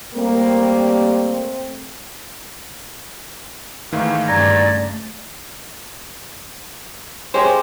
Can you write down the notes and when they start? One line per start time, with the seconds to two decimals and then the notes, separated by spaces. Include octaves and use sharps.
0.14 G3 A3 A#3 C4
3.92 G#2 D#3 E3 A3 F5
4.28 G2 C#3 A3 D5 A#5 G#6 A#6
7.34 G#3 C#4 G4 C5